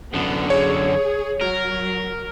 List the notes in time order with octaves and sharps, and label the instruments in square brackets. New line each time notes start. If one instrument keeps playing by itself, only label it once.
[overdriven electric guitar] F#2 D3 [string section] B3
[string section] G#4 [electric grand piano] C#5
[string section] F#3 [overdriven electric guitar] A#4